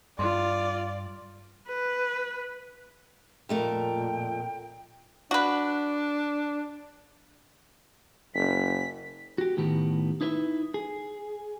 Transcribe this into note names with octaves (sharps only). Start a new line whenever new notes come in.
G2 F4 D5 C6
B4
F2 A#2 A3 A#4 G5
D4 F#4 B4
F#1 B6
F#4 G4
A2 D#3 B3 G4
D#4 E4 B4 C#5 E5
G#4